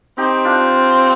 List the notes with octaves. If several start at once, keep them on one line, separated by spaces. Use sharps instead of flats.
C4 D#4 G4
D4 F4